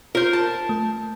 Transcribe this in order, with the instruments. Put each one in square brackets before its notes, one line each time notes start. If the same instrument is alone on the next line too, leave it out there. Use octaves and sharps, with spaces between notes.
[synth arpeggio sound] F4 [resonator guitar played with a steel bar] A#4 C5
[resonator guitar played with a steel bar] A5
[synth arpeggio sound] A3